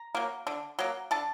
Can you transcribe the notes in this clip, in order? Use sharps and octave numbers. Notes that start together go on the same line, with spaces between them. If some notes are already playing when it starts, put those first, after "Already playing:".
Already playing: A#5
F#3 A#3
D3
F#3 A#3
D3 A5